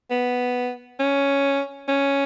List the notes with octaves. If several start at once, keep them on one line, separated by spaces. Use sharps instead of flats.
B3
C#4
C#4